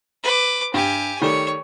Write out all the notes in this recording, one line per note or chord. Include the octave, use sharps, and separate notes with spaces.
B4 D6
G2 G4 G#5
D#3 G3 A3 C#5